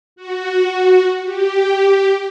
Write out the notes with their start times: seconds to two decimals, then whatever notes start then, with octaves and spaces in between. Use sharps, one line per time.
0.16 F#4
1.24 G4